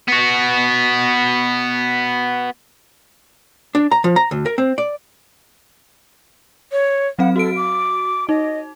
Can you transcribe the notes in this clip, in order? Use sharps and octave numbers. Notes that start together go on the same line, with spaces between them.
B3 F#4
D4
A#5
F3
A#5
D2
A#4
C4
D5
C#5
F#3 C4 F5 F#5
F#4 A4 D7
D6
D#4 D#5